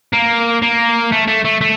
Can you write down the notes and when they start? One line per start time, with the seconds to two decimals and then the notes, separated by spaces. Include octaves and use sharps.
0.13 A#3
0.62 A#3
1.12 A3
1.28 A3
1.45 A3
1.61 A3